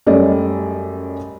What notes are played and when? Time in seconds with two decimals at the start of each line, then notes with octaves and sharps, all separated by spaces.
0.07 F#2 G3 A3 C#4 D5 D#5